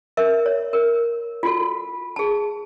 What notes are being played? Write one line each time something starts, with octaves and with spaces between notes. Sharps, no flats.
A#4 E5
C#5
A#4
F4 F#4 A4
G#4 A5